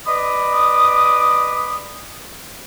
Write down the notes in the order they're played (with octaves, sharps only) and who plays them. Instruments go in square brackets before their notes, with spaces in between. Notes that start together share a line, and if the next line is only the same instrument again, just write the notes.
[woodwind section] B4 D5 D#5 B5 D6 D#6